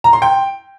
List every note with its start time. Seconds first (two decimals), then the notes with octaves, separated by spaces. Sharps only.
0.04 A#5
0.13 C6
0.22 G5